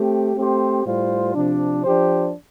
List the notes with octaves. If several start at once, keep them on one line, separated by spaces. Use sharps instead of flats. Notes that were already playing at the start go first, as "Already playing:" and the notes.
Already playing: A3 C4 G4
A3 C4 G4 C5
A2 G3 F4 C5
C3 F3 D4
F3 D4 G4 C5